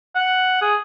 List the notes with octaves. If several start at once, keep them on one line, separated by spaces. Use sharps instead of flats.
F#5
G#4